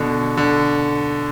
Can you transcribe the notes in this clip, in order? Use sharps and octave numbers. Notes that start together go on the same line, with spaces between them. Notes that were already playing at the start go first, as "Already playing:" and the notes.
Already playing: B2 D3
D3